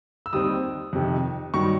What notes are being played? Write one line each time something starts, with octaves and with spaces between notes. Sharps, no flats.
E6
D#2 D#3 G3 C4 D#6
F2 C3 D#3
G2 D#3 F#3 C#6